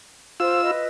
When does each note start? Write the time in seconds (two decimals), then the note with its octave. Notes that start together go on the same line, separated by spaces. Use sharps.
0.40 F4 C5 E6
0.63 B4 D#5